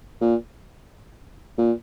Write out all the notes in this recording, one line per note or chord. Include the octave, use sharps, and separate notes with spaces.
A#2
A#2